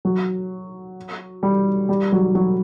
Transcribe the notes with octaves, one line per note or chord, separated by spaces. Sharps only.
F#3
G3
G3
F#3
F#3